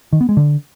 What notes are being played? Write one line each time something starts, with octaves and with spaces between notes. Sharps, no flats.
D#3
B3
G#3
D3